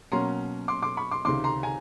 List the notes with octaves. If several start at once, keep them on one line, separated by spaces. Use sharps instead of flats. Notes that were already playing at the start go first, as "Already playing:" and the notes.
B2 F#3 A#3 C#4 A#5 C6
C6 D6
C6 D6
B5 C#6
C6 D6
C#2 C3 D#3 C6 D6
A#5 C6
G#5 A#5